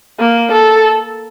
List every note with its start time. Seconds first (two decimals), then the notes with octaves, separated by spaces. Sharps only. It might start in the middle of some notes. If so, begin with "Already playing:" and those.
0.19 A#3
0.52 A4